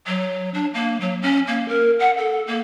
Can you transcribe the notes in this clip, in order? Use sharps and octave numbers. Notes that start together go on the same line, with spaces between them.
F#3
D4
A#3
F#3
C#4
A#3
A#4
F#5
A4
A#3